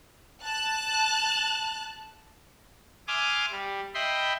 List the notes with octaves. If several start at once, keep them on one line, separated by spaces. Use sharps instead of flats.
A5 F#6
E5 G#5 C6 D6 D#6 F6
G3
D#5 E5 G5 B5 C6